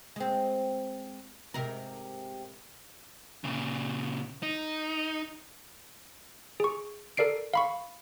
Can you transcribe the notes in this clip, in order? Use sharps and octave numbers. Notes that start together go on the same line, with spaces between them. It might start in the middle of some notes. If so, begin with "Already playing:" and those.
G#3 C4
G#2 C3 A#4
A#2 C#3
D#4
G#4 C#6
A4 A#4 D5 C7 D7
F5 B5 C#6